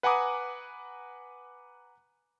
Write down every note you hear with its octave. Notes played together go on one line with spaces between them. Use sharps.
B4 F#5 G#5 A#5 D6 D#6